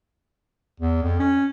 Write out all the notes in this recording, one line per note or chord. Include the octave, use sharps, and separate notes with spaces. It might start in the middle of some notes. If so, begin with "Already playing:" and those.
E2
F2
C#4